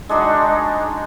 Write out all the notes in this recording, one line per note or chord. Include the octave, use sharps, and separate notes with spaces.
G#3 D4 D#4 F#4